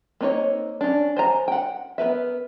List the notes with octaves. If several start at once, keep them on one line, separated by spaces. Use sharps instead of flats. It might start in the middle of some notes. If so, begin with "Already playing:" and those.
A#3 C4 D#4 A#4 C#5
C#4 D4
C5 G#5 A#5
F#5 G5
B3 A#4 B4 E5